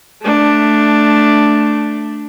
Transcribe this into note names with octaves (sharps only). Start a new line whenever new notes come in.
A3 D4